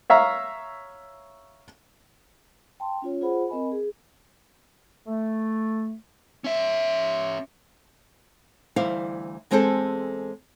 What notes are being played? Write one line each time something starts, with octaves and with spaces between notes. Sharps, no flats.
C#5 E5 F5 A#5
G5 A5 C6
C#4 F4 C#5
F4 G#4 C5 F#5 B5
C4 A#4 D#5 G#5 B5
G#4
A3
C#4 E5
D2 E3 G3 E4 C5 F5
E2 G#3 C4 G#4 A4 C5